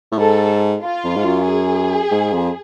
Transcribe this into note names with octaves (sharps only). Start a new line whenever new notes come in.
A2
G#2 A4
F4
F2
G#2
F#2
G#4
G#2
F2